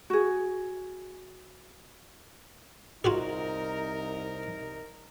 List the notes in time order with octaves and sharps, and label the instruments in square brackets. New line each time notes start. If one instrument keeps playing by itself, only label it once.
[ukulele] F#4 G#4
[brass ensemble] C2 D#4 A#4 [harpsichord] F4 F#4 G#4